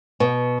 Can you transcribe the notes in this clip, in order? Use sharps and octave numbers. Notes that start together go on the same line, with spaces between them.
B2